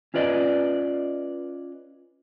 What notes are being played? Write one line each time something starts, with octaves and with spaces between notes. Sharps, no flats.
C#4 F4 B4 D5 D#5